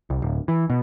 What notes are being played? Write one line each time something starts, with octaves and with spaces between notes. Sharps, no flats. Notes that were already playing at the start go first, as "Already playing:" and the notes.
C2
D1
E3
B2